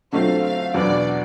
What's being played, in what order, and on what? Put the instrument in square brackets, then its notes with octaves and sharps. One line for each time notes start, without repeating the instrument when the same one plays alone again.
[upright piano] D3 F#3 A3 C4 F4 [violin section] F5
[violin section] F5
[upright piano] E2 B2 F#3 B3 D4 [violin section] D5